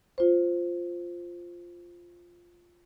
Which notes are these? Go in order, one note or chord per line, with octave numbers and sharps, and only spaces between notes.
F4 C5